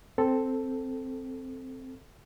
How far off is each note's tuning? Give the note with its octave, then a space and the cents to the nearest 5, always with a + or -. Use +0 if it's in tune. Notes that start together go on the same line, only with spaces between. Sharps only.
C4 +0 A4 +0